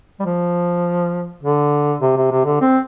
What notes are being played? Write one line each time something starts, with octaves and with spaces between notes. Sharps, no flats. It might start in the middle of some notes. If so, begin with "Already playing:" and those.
G3
F3
D3
C3
C3
C3
D3
C4